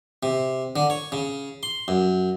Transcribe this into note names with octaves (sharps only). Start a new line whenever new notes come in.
C3
D3
C#5
C#3
C6
F#2